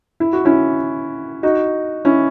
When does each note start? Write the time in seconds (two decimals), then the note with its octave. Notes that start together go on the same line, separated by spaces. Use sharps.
0.20 E4
0.33 F#4
0.45 C#4 E4
1.43 D#4 F#4
2.05 C#4 E4